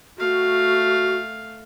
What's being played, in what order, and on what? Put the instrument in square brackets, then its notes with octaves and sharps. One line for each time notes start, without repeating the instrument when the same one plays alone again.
[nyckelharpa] A3 F5 [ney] F#4